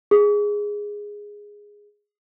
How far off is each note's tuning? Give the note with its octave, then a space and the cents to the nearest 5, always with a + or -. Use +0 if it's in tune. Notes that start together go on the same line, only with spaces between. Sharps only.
G#4 -5